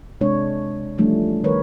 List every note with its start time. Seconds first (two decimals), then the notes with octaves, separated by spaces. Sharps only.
0.21 C3 G#3 D4 C#5
0.98 E3 F3 G3 A3 C#4 D4
1.44 D#3 G3 A#4 B4 C#5